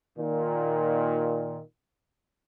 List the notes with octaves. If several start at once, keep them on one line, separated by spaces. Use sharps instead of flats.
A#2 D#3